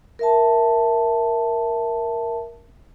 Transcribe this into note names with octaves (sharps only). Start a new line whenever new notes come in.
A#4 E5 A5